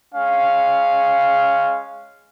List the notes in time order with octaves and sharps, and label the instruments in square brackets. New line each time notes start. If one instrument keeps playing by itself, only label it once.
[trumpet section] G#3 C#4 F5